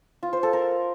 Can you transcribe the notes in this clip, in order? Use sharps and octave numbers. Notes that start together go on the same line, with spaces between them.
F4
C5
A4
A#4